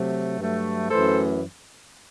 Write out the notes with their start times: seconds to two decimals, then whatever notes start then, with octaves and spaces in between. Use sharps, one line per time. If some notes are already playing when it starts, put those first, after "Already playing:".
Already playing: C3 F#3 A3
0.39 G2 F#3 A3
0.90 F#2 E3 A3 A4 C5